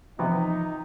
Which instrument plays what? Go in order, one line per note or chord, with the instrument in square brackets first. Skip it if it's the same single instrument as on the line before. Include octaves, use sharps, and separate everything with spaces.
[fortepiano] C3 B3 [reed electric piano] E3 F3 [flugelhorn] D#4